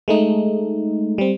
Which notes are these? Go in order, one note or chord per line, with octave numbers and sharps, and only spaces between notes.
G#3 A3 D#4
G3 C4